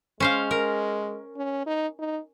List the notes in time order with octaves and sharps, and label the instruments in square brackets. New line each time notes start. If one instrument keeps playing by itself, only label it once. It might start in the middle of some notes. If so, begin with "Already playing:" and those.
[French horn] G#3 [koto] C#4 C5 F5
[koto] A#4
[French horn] C#4
D#4
D#4